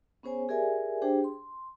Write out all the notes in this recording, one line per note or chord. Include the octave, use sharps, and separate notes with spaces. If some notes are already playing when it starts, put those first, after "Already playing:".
B3 C#4 G#4 C5 C#5 G#5
G4 G#4 A#4 D5 E5 G#5
D4 G4 G#4 C5 G5
C6